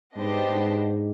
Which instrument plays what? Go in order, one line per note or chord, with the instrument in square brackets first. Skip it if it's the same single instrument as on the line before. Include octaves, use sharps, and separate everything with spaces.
[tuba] G#2 [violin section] B3 D4 G4 C5 D#5
[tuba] G#2